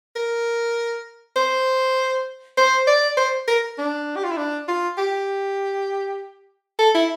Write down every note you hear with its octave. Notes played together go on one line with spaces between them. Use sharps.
A#4
C5
C5
D5
C5
A#4
D4
G4
F4
E4
D4
F4
G4
A4
E4